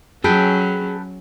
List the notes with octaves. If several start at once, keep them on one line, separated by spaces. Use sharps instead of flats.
F#3 C#4 G#4 A4 B4 G5